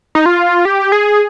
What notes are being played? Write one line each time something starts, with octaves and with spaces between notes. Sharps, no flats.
D#4
F4
G4
G#4